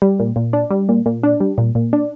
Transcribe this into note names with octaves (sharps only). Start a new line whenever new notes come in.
G3
A#2
A#2
D4
G3
A#2
A#2
D4
G3
A#2
A#2
D4